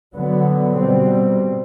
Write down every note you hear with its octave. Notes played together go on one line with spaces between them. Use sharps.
D3 F#3 B3
B2 G3 C4